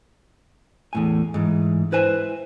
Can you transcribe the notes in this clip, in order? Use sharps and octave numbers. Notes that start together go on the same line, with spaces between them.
E2 A2 G#5
G#2 E3
E4 B4 C5 G#5